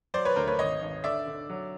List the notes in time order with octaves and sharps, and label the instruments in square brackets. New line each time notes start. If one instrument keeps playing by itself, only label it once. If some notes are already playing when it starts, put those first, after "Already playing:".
[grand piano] F#3 C5 D5
B4 C#5
D2 A#4 C5
B4 C#5
G#1 C#5 D#5
G#1
D3 D5 E5
D3
F#3